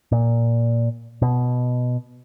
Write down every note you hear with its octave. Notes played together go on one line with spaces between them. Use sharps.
A#2
B2